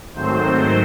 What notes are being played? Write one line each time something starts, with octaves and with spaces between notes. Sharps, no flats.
G#2 D#3 F#3 A3 C4 C5